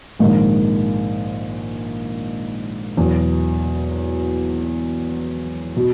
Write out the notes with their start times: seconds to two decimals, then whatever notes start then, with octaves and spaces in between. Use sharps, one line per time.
0.19 A#1 G#2 D#3 G#3
2.97 E2 B2 F#3
5.76 B2